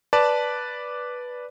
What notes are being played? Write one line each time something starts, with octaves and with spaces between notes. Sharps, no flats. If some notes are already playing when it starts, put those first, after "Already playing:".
B4 D5 A5